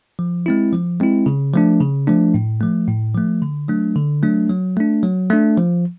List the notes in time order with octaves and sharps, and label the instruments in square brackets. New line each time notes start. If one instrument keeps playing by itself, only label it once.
[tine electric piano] F3
G#3 C4 E4
F3
G#3 C4 E4
C#3
F3 A3 D4
C#3
F3 A3 D4
A2
F3 A3
A2
F3 A3
D3
F#3 A3 D4
D3
F#3 A3 D4
F#3
A3 D4
F#3
A3 D4
F3